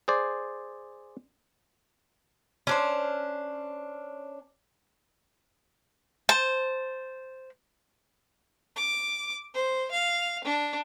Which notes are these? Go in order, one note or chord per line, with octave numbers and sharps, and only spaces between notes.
G#4 C5 D5
C#4 D4 C5
C5 A5
D6
C5
F5
D4